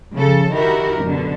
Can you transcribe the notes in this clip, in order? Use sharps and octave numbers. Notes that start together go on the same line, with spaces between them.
C#3 F3 A4
D#3 E4 F#4 G4 A#4
F#2 B2 D3